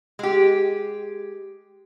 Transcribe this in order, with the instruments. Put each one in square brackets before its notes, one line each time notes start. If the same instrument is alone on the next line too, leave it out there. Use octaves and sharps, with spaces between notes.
[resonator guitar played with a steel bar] G#3 G4